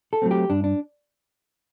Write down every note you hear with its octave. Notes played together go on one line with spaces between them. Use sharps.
A4
F#3 A3 C4
G4
G2 D4
D4